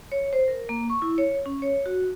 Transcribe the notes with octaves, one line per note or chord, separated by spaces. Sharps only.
C#5
C5
A#4
A#3
C#6
E4
C#5
C#4
C#5
F#4